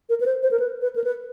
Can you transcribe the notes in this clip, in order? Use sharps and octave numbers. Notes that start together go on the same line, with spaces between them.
A#4
B4
C5
C5
A#4
B4
B4
A#4
B4